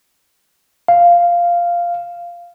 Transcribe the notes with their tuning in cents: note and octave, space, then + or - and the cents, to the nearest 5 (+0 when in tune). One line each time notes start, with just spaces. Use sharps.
F5 -5